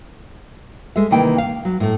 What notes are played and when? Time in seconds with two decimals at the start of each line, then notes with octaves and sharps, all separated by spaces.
0.96 G#3 A4 E5
1.11 C3 D#3 E3 A#3 G5
1.38 F5
1.65 F#3
1.80 A2 A3